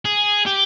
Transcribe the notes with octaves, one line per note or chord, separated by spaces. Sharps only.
G#4
G4